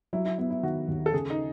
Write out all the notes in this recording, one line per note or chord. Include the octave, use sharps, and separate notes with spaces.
F#3 E4
E4
B3 E4
E4
D#3 F#4
D#2
A4
C#3 G#4
D#4